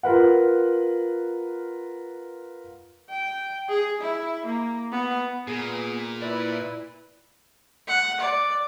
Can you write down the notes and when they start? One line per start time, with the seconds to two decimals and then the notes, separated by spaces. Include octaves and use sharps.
0.03 F4 A#4 B4 F#5
3.10 G5
3.68 G#4
4.01 E4
4.46 A#3
4.92 B3
5.48 A#2 B3 G#4
6.22 E4 B4 D5
7.88 F#5
8.20 D5